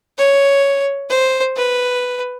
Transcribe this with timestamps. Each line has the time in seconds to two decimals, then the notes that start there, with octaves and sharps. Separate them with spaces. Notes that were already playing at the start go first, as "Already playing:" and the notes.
0.18 C#5
1.10 C5
1.56 B4